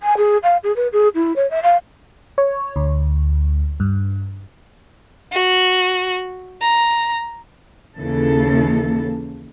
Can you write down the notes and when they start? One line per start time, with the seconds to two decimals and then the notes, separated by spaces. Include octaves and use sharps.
0.02 G#5
0.17 G#4
0.43 F5
0.63 G#4
0.76 B4
0.92 G#4
1.14 E4
1.36 C#5
1.50 E5
1.63 F5
2.38 C#5
2.76 D2
3.80 G2
5.32 F#4
6.62 A#5
7.97 D#2 C#3 E3 A#3 A4